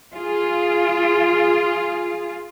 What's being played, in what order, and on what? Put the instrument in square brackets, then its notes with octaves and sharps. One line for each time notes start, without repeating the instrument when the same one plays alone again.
[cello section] F4 G#4